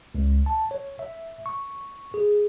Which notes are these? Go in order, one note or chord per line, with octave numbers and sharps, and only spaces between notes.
C#2
A5
C#5
E5
C#6
G#4